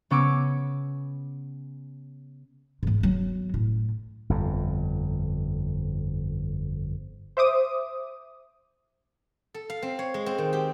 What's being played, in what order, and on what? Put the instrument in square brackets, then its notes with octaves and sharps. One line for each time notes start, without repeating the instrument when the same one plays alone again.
[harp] C#3 B3 C#4 C#6 D6 E6
[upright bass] G#2 E3
F#3 B3
A2
[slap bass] G1 F2
[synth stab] C5 E5 D6 D#6
[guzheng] A4
F5
C4
C#5
G#3
C4
D#3
G4